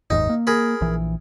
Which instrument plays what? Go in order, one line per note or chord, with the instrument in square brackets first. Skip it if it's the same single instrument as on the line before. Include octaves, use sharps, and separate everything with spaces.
[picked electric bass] F#1 D#2 G#2 [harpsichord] D#4
[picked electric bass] A#3
[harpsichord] G#4 A#4 B5
[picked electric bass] A#1 E3